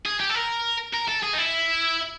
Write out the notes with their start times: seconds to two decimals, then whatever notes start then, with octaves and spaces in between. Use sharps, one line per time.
0.05 G#4
0.20 G4
0.30 A4
0.35 A#4
0.94 A#4
1.09 A4
1.23 G#4
1.33 D#4
1.38 E4